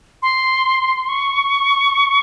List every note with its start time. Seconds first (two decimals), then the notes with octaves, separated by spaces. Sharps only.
0.22 C6
1.09 C#6